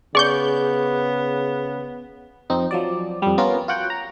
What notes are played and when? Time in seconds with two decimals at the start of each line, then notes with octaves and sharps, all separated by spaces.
0.15 C#3 B3 G#4 D5 C#6 G6
2.50 F2 C4 D#4
2.71 F3 F#3 D5
3.22 F2 G3
3.38 B3 C#4 F4 A#4
3.68 F4 F#4 F#5 G5
3.90 A#5